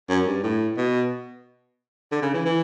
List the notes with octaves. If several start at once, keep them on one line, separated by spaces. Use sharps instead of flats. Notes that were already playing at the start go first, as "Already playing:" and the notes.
F#2
G2
A2
B2
D3
C#3
E3
E3